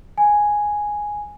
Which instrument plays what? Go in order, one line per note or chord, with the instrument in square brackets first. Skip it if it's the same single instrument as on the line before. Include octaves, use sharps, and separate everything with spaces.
[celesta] G#5